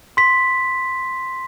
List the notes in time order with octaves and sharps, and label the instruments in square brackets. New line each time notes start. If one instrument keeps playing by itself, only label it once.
[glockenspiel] C6 B6